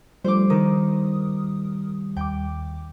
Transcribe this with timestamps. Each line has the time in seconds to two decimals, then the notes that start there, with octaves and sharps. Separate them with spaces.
0.24 F3 G3 A3 D4 C5 D6
0.50 D#3 A#4 D#6
2.17 D#2 G5 D6